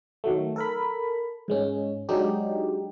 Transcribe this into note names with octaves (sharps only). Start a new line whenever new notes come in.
D#3 F#3 A3
A4 A#4 B5
G#2 G#3 C#4
F#3 G#3 D4 D#4 G4